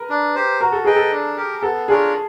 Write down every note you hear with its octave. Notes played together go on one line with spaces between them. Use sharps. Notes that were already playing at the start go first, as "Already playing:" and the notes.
Already playing: A#4 B4
D4
G4 C5
F#4 A#4
A4
G#4 B4 D#5 G5
A4
D4
G4 A#4
B3 A4
D4 F4 G#4 A#4 C#5